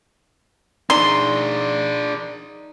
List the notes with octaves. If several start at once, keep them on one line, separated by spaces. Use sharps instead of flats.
D4 D#4 G#4 C6